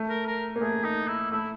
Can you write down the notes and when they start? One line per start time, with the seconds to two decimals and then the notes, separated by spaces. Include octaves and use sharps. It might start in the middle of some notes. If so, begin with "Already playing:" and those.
Already playing: A3
0.09 A#4
0.27 A#4
0.56 A#3
0.61 A3 G#4
0.84 D#4
1.08 E4
1.31 A3 E4